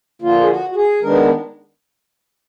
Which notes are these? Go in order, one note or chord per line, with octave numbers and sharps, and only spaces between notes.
D3 F3 A#3 F4
G#4
F#4
F#4
G#4
D#3 G#3 B3 D4 A#4